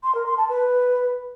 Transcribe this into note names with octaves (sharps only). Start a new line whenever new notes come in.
C6
A#4
C6
A5
B4